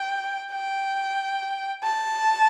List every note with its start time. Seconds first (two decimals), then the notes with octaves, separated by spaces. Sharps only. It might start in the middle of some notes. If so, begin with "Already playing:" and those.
Already playing: G5
0.53 G5
1.83 A5